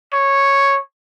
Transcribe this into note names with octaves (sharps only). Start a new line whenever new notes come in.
C#5